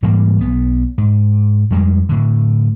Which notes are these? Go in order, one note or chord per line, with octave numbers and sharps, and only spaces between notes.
G#2 E3 G3 A#3
B1 B3
G#2
F2 G3 G#3
A2 D3